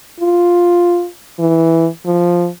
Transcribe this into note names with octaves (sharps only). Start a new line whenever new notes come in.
F4
E3
F3